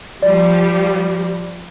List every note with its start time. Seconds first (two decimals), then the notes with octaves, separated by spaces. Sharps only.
0.22 F3 G3 D5